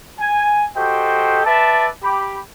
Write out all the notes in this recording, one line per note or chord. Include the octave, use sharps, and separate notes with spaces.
G#5
F#4 G4 A4 C5 D#5 G5
B4 D5 E5 A5
G4 B5